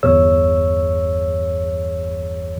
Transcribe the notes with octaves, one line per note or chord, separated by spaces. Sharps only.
G1 E2 G2 G#4 C#5 E6